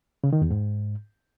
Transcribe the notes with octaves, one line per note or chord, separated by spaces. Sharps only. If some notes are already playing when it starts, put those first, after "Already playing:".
C#3
D#3
E2
G#2